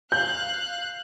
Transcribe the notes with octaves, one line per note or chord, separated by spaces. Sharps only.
F5 F#6 G6